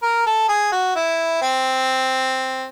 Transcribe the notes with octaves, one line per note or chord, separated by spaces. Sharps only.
A#4
A4
G#4
F#4
E4
C4